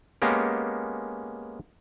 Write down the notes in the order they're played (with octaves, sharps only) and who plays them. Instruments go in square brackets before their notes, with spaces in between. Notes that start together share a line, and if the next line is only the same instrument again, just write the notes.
[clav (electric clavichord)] G#3 A#3 B3 C#4 G4